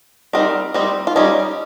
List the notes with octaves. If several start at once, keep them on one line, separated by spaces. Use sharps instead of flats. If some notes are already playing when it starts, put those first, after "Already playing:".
G3 C4 D#4 A#4
G3 C4 D#4
F4
G3 C#4 D#4